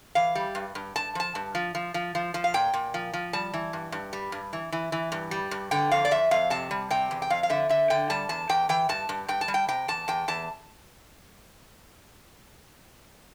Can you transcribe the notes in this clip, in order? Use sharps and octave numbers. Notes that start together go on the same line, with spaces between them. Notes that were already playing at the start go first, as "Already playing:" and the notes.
E3 F5
G3
G2
G2
G2 A5
F3 A5
G2
F3
F3
F3
F3
F3
F5
A#2 G5
A#2
F3
F3
G3 A5
E3
G2
G2
G3
G2
E3
E3
E3
G2
G3
G2
D3 G5
F2 F5
D5
F2 E5
F2 F5
C3 A5
G3
C3 G5
E2
G5
F2 F5
F5
D3 E5
D3 E5
D3 G5
G3 A5
E2 A5
E2 G5
E3 G5
G2 A5
G2
G2 G5
A5
G3
G5
C3 G5
E2 A5
E2 G5
E2 A5